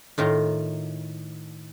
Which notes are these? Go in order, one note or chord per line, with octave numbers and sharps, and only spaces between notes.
A2 D#3 F4 A#5